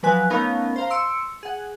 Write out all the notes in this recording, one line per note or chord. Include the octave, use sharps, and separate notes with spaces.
F3 F#3 B4 G#5 F#6
A3 B3 C#4 D#4 A#4 F5
C5 F5 A#5
C6 E6 C#7 D7
G#4 F#5